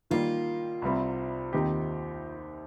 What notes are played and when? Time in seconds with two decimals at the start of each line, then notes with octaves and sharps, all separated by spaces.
0.11 D#3 G3 A#3 F4
0.82 C2 C3 G3 C4
1.53 D#2 D#3 C4 D#4 G4